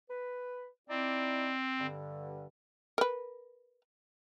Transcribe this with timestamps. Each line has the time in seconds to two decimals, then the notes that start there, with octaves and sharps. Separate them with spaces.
0.10 B4
0.89 C4 D#4 E4 D5
1.79 G2 D3
2.98 A#4 B4